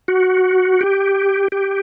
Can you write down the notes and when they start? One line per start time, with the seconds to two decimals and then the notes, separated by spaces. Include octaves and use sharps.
0.08 F#4
0.81 G4
1.52 G4